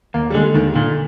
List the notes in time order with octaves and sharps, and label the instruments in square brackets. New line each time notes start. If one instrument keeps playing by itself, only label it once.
[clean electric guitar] D#2 [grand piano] A#3
[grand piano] G3
[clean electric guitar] D3 [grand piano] G#3
[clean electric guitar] D#2 [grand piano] D#3
[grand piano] A#2 [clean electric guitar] D3